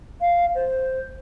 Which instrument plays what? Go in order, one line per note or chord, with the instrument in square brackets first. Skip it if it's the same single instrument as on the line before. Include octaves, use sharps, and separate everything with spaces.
[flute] F5
C5